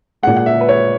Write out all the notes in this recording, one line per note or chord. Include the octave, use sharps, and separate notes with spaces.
A#2 G#3 F#5
F#5
E5
B4
C#5